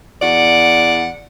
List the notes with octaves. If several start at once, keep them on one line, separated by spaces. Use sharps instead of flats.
E2 D5 F#5